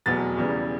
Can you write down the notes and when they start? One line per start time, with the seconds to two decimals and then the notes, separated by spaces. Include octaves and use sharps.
0.06 F1 E2 B2 F#3 B3 A6
0.37 E1 E2 C#3 E3 G3